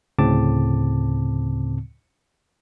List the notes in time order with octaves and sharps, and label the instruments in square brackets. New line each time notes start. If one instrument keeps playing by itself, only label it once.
[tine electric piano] D2 A2 C#3 C4 A5 D6